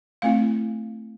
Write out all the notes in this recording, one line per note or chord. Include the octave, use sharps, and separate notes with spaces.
A3 C4 E4 F5